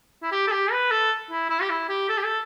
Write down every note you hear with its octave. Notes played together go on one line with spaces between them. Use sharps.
E4
G4
A4
G4
B4
A4
E4
E4
G4
E4
G4
A4
G4
A4